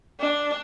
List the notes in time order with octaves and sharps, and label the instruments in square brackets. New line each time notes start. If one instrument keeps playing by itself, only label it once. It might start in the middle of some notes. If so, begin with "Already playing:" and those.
[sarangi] D4